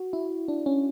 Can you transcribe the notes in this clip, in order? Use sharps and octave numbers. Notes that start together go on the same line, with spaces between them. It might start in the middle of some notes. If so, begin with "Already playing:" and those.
Already playing: F#4
E4
D4
C#4